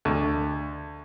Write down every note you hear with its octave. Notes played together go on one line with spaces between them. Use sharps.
D2